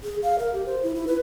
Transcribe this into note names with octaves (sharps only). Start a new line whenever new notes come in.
G#4
F5
A#4
G4
C5
E4
E4
B4